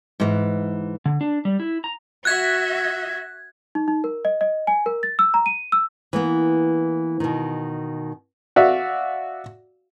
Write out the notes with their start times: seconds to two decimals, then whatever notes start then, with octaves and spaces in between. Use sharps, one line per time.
0.20 G#2 E3
1.05 D3
1.21 D4
1.45 G3
1.60 E4
1.84 A#5
2.25 F#4 E5 F#6 G#6
3.75 D#4
3.88 D#4
4.04 A#4
4.25 D#5
4.41 D#5
4.67 G#5
4.86 A#4
5.03 A6
5.19 E6
5.34 A#5
5.46 D#7
5.72 E6
6.13 E3 A#3 B3
7.20 B2 D#3
8.56 F#4 D5 E5 F5